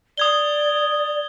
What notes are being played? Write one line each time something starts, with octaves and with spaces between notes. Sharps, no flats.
D5 D#6 G#6 G7